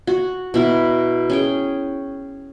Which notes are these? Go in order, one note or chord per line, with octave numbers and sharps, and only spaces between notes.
F#4
B2 E4 A#4
C#4 G#4 G5